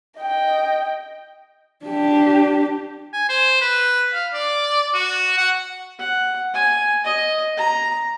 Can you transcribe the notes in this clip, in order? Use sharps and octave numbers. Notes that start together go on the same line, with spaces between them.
D#5 G5
D4 G4
G#5
C5
B4
F5
D5
F#4
F#5
F#5
G#5
D#5
A#5